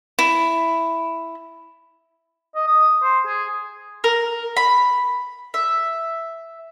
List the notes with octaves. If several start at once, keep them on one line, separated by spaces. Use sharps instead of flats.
E4
D#5
D#6
C5
G#4
A#4
B5
E5